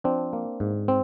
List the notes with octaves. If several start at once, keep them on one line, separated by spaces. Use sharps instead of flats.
F3 C4 D4
A#3
G#2
C4